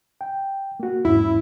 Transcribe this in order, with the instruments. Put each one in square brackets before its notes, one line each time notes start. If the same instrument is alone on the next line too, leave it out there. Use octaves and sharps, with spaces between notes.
[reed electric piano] G5
A#3 F#4
[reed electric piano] E2 G#2 C#4 [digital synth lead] E4